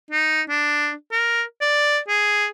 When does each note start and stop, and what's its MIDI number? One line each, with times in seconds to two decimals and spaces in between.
0.11 0.42 63
0.50 0.93 62
1.11 1.43 70
1.61 1.99 74
2.08 2.47 68